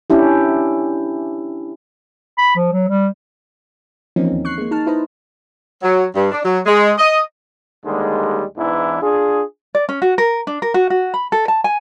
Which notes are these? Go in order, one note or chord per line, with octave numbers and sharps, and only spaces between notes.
C#4 D4 E4 G4
B5
F3
F#3
G3
E3 F3 A#3 C4 C#4 D#4
D#2
C#6 F#6 C7
G#3 A#3
D#4 A5 F6
D#4 E4 B4 C5 D#5
F#3
G2
D4
F#3
G#3
D#5
D#2 D3 G3 G#3
E2 G#2 E3 D4 E4
D4 F4 G#4
D5
C#4
F#4
A#4
D4
A#4
F#4
F#4
B5
A4
A5
G#5